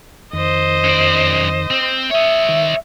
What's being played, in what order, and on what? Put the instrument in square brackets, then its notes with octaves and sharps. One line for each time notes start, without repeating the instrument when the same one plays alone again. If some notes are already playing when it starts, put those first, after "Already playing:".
[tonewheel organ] F2 D#3 [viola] C5 D#5
[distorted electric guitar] F#2 D5
C4
[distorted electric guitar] C#5 D#5 [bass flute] E5
[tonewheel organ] D#3